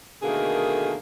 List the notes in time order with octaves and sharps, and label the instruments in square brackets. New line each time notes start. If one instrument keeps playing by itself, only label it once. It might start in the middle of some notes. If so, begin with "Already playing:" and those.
[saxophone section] B2 D3 D#3 A3 A#3 G#4